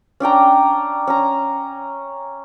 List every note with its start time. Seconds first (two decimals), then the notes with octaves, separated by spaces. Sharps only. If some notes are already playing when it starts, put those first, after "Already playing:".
0.20 C#4 D4 G5 A#5
1.07 C#4 A#5